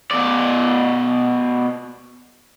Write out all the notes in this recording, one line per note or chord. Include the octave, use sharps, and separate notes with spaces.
B2 D5